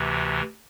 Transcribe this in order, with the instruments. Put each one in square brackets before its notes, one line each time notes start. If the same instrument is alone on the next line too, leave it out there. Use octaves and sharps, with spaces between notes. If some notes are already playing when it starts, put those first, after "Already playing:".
Already playing: [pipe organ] D2 C3 E3